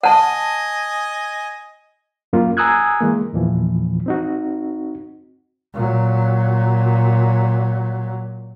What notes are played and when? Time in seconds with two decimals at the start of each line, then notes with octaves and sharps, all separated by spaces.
0.03 D#5 F#5 G#5 A5
2.33 F#2 A#3 F4
2.57 G#5 A#5 D#6 E6 F#6 G#6
3.01 E3 G#3 A#3
3.33 E2 A#2 E3 F3
4.06 C4 D#4 F#4
5.73 A#2 F#3